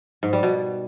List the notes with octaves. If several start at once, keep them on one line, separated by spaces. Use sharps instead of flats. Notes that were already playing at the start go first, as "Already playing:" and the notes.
G#2
G3
B2